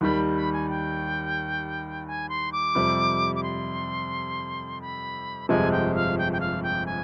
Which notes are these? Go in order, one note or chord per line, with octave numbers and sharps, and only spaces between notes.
D#2 D#3 G3 B5
B5
G#5
G5
G#5
C6
D6
F2 C3 G3
D6
C6
B5
G1 F2 C3 F3 G#3 G#5
G5
F5
G5
G5
F5
G5
G#5